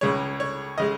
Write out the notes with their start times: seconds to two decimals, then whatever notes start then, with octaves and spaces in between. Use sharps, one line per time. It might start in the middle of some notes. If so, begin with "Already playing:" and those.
0.01 C#2 C#3 G#3 C#5
0.40 C#5
0.78 C#3 G#3 D#5